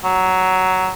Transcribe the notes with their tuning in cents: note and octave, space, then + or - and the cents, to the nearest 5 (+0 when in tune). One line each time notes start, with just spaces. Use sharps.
F#3 +10